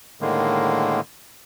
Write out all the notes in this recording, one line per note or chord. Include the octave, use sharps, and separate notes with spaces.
A2 D3 D#3 G#3 A#3